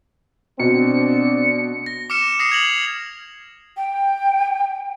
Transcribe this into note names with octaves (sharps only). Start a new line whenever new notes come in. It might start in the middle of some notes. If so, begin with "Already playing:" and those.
B2 C4 D4 C#7
A#6
D6 F6 C#7 E7
D#6 A#6 C7 C#7
G#6 F7 F#7
G5